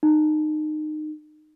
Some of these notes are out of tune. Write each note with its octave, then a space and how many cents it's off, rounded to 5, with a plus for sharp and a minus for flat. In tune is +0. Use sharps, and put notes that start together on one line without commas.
D#4 -25